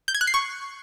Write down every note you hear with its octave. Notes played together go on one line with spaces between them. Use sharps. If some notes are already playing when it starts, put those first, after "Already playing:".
G6
G#6
F#6
C7
C#6